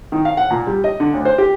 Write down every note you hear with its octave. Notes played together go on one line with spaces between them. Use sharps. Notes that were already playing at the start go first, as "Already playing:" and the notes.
D#3
F5
F#5
A#2
G3
D#5
D3
D2
C5
G4